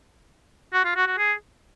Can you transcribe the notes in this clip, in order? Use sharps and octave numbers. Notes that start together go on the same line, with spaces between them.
F#4
F4
F#4
F#4
G#4